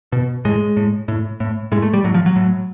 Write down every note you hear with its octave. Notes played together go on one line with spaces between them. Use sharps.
B2
A2 G#3
A2
A2
A2
A2 G#3
A3
G3
A2 F#3
F3
F#3
A2